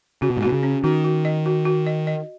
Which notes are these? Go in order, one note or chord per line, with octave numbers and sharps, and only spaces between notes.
C#3 F#4
B2
G#2
B2 F#4
C#3
C#4
D#3 F#4
F#4
D#5
F#4
F#4
D#5
D#5